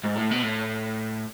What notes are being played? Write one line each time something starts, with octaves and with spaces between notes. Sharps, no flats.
G#2
A2
B2
A2